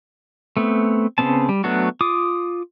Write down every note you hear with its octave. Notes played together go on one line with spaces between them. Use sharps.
A3 B3 C4
C#3 G3 B3 C4 A5
G3
F#3 A3 B3 D4 F#4
F4 D6 D#6